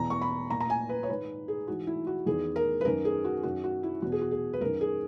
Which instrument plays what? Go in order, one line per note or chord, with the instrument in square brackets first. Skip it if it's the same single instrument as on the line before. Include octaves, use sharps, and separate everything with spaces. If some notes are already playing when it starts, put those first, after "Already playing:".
Already playing: [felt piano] E2 B2 A#5
C#6
B5
A#2 A#5
A#5
G#5
B4
C#5
G#2 D#3 B4
G#4
G#2 E3 F#4
E4
F#4
E2 D#3 G#4
A#4
B4
F#2 D#3 A#4
G#4
F#4
F#2 D#3 F#4
F#4
E4
E2 B2 F#4
G#4
F#4
G#4
B4
F#2 D#3 A#4
G#4